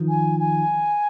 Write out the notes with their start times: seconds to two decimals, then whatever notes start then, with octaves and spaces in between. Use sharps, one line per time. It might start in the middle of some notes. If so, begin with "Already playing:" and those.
Already playing: D#3 F3
0.09 G#5
0.40 G#5